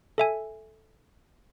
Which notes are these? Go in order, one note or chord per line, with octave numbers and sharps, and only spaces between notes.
A4 E5 G#5